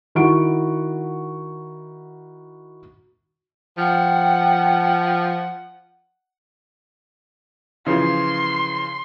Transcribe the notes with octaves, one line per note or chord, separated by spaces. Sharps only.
D#3 E4 F#4 F#5 C#6 D7
F3 F#5 G5
C#3 E3 F3 C6